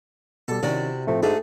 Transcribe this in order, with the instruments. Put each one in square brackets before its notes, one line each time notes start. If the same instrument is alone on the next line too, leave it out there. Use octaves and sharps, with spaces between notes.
[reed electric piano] B2 G3 [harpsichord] A4
[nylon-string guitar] C3 E4 [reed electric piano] D#3 C#4 [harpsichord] F#4 D5
[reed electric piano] A2 F3 C4 [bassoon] A3
[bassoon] G#2 [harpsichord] A3 [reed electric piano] D4 A5 [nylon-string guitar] F#4 G#4 A4